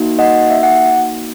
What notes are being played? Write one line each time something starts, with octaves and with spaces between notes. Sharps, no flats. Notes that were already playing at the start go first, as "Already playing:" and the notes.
Already playing: A#3 D#4 F#4
D#5 F#5
E5
F#5